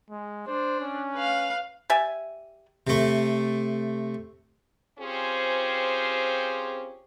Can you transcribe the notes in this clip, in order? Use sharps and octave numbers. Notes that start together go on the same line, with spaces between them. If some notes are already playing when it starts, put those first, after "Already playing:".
G#3
D4 C5
C#4
B4 F5
G4 D5 E5 G#5
C3 A3
C4 C#4 F4 G4 G#4 C5